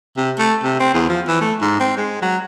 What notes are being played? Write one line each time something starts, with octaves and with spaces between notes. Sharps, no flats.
C3
A3
C3
C4
E2
F3
E3
A3
G#2
C4
G#3
F#3